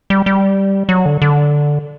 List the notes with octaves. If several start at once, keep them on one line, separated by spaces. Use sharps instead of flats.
G3
G3
F#3
D3
D3